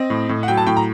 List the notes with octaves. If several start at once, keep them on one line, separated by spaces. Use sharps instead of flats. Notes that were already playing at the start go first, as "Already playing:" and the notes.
Already playing: C4 D#5
A2
A2
F#5
F#3 G5
A5
A2 G5
A#5